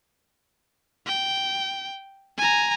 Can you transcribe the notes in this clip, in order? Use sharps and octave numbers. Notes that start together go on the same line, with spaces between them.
G5
G#5 A#5